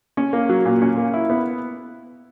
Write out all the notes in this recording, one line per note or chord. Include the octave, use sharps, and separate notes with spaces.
C#4
A#3
F#3
A#2
C#4
A#3
E4
B3